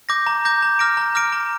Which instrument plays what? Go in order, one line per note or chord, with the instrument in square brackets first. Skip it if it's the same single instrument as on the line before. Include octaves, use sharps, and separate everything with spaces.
[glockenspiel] D6 G6 A#6
A#5
D6 G6 A#6
A#5
D6 F6 A#6 D7
A#5
D6 F6 A#6 D7
A#5